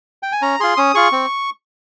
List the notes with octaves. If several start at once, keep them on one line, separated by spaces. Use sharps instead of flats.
G5
G#5
C#4 A#5
F4 G#4 C6
C#4 D#6
F4 G#4 C#6
C4